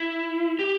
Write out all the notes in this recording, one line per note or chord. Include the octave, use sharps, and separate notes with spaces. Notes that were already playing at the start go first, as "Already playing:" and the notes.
Already playing: E4
G4